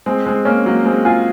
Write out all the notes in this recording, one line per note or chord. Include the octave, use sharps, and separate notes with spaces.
G#3 C4
G#3 C4
A#3 C#4
F#3 A#3
G#3 C4
F4 G#4